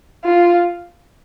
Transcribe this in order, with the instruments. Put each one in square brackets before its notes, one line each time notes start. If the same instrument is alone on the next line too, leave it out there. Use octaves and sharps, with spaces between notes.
[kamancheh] F4